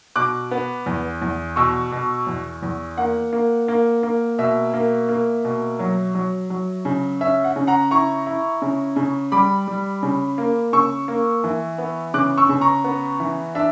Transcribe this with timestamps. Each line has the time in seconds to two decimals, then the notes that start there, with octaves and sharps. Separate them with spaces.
0.16 B2 D6 F#6
0.51 B3
0.86 E2
1.22 E2
1.56 B2 C#6 E6
1.92 B2
2.27 E2
2.62 E2
2.97 A#3 F#5
3.33 A#3
3.68 A#3
4.03 A#3
4.38 B2 E5
4.74 A#3
5.09 A#3
5.44 B2
5.79 F#3
6.15 F#3
6.50 F#3
6.85 C#3
7.21 C#4 E5
7.44 F#5
7.56 C#3
7.67 F#5 A#5
7.91 E4 A#5 C#6
8.26 E4
8.62 C#3
8.96 C#3
9.32 G3 B5 D6
9.67 G3
10.03 C#3
10.38 A#3
10.73 C#3 C#6 E6
11.08 A#3
11.44 E3
11.78 B3
12.14 C#3 D6 F#6
12.37 C#6 E6
12.49 C#3
12.61 A#5 C#6
12.84 B3
13.20 E3
13.55 D4 E5